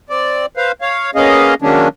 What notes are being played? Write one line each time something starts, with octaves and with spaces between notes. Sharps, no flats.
C4 D5
B4 C5 F5
C#5 F5
A#3 B3 C#4 G#4 D#5 F5
D#3 F#3 G#3 A#3 C#4 D4